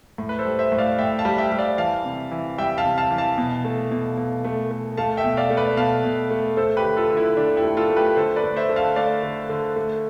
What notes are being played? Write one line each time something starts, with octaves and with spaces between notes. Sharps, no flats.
A2
B4
A4 C5
G3
C5 E5
A2
D5 F5
A2 E5 G5
F5 A5
G3
E5 G5
G3
D5 F5
E3 F5 A5
C3
E3
G3 E5 G5
F5 A5
C3
F5 A5
E3
F5 A5
B2
A3
B2
B2
A3
A3
A3 F5 A5
E5 G5
B2
D5 F5
A3
B4 D5
B2 F5 A5
B2
A3
A3 A4 C5
G4 B4
D3
F4 A4
D3
E4
D3 D4 F4
E4 G4
A3
F4 A4
A3
G4 B4
D3 A4 C5
B4 D5
A3
C5 E5
D3
F5 A5
A3 D5 F5
D3
D3
A3